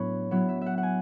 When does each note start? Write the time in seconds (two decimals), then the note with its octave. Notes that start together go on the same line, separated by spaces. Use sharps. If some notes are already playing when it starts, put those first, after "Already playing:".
Already playing: A2 F#3 B3 D4 B4 C#5
0.31 F#3 B3 E4
0.49 E5
0.61 E5 F#5
0.78 F#5
0.83 G#5